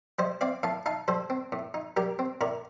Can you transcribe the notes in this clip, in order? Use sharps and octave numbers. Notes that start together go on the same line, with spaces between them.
G3 C5 D#5
C4 D5 F5
A2 F5 A5
D#4 F5 A5
G3 A4 C5
C4
A2
D#4
G3 G4 A#4
C4
A2 A#4 D5